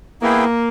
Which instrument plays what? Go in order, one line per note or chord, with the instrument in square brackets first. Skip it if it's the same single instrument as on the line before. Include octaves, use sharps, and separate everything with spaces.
[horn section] A#3 [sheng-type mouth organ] B3 E4 G#4 B4 G5